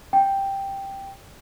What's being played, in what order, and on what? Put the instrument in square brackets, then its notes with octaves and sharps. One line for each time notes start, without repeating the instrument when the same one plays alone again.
[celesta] G5